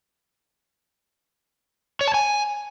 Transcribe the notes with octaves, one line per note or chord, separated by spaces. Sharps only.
C#5
A5
G#5